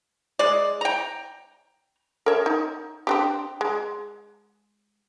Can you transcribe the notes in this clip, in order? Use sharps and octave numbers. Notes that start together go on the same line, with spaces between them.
G#3 D5
G5 A#5
A#4 C#5 E5
D#4
C4 D4 G4
G#3